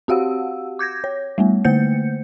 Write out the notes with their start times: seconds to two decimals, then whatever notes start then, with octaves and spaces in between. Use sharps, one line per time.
0.08 C4 F#4 G4 F5 F#5 E6
0.79 D6 G6 G#6 A#6
1.04 C#5
1.38 G3 A3 B3
1.65 D3 A3 A#3 C5 G6 C#7